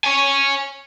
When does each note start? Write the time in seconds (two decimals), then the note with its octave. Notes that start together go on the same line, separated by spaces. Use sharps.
0.04 C#5 G#5